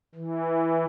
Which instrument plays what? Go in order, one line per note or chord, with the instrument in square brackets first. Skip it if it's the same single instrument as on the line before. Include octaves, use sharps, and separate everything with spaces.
[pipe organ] E3